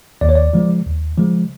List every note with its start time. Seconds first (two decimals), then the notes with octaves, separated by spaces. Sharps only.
0.21 D#2 D5
0.29 C#5
0.35 D5
0.53 C#3 F3 G#3
0.86 D#2
1.17 C#3 F3 G#3